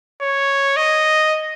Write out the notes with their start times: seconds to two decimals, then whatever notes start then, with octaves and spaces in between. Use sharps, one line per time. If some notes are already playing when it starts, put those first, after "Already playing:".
0.22 C#5
0.77 D#5